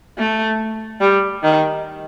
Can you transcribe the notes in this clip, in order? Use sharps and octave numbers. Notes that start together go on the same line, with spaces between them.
A3
G3
D#3